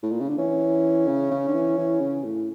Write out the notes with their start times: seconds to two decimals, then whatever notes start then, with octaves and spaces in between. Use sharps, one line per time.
0.03 A2
0.12 A#2
0.20 C#3
0.29 D3
0.38 E3 C#4
1.08 C#3
1.31 C#3
1.48 D3
1.54 E3
1.78 E3
2.01 C#3
2.24 A2